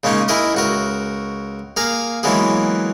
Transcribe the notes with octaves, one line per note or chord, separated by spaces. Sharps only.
C#3 G#3 A#3 C#4 D#4
E4 G#4 A#4 D#5 D#6
C#2 F#4 A#4
A#3 G#4 F5 A#5
E3 F#3 G#3 A#3 B3 G#4